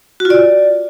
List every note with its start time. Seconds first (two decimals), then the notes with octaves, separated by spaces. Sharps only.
0.20 F#4
0.25 F4
0.30 D5